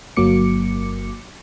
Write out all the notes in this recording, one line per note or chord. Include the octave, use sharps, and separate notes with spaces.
G1 F#3 A#3 D6 C#7